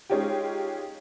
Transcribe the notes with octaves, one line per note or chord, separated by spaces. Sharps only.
G#3 C#4 D#4 F4 G4